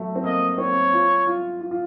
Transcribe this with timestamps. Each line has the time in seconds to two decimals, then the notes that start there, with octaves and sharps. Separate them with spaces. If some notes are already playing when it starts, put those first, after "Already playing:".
Already playing: F#3 A3
0.15 C4
0.24 A#3 D#5
0.58 C4 C#5
0.93 F4
1.27 F4
1.61 F4
1.71 F4